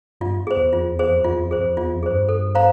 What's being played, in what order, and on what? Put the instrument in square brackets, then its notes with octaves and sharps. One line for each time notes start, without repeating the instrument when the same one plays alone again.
[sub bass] G2 [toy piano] F4
[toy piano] G#4 C5
[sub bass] E2
[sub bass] F2 [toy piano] F4
[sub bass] E2
[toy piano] G#4 C5
[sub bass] F2
[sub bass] F2 [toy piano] F4
[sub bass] E2
F2
[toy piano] G#4 C5
[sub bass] F2
[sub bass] E2 [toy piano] F4
[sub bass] F2
[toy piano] G#4 C5
[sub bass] G2
[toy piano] A4
C5 F5 A#5